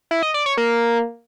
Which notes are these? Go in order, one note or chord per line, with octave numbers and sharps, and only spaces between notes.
E4
D#5
D5
C#5
A#3